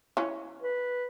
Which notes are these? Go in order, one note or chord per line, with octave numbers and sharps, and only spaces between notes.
E3 C#4
B4